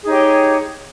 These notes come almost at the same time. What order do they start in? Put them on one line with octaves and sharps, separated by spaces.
G#4 D#4 C#5 G4